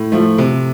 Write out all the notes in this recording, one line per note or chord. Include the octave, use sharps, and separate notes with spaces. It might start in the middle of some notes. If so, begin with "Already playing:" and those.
Already playing: A2
F3 A3
C3